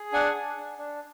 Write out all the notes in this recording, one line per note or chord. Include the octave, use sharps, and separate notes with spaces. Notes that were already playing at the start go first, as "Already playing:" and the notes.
Already playing: G#4
D4 F#5 G#5
D4
D4
D4